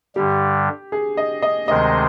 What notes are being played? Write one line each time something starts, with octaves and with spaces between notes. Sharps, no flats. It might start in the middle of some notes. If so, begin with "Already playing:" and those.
G2 D3 G3 G4
G#4
D#5
D#5
D2 C3 D#3 G#3 C4 D#5